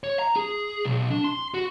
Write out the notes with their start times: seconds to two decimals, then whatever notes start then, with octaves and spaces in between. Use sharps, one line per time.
0.04 C#5
0.19 A#5
0.36 G#4
0.85 B1
1.10 D4
1.24 C6
1.54 F#4